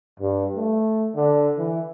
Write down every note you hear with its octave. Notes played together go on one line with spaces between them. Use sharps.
G2
A3
D3
E3